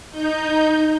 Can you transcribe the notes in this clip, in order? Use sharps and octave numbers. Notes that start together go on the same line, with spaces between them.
D#4 G6